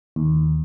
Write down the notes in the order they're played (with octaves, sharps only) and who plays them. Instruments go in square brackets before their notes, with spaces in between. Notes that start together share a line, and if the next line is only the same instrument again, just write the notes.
[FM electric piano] D#2